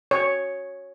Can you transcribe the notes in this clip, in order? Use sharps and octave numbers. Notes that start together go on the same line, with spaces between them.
C#5